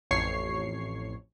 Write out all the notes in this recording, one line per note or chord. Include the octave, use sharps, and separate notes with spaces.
A1 F2 C#5 C#6 C7